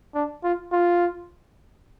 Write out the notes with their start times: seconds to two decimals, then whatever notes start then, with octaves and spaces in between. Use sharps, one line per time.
0.15 D4
0.44 F4
0.72 F4